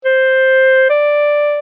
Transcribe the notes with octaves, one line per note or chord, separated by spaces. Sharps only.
C5
D5